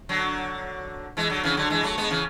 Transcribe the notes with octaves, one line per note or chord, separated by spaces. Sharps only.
D3 F#3
E3 G#3
D3 F#3
C#3 E3
D3 F#3
E3 G#3
F#3 A3
G#3 B3
C#3 E3